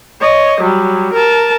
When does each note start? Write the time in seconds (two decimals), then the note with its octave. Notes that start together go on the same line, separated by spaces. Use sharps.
0.21 C#5 D#5
0.61 F#3 G3
1.14 A#4 A5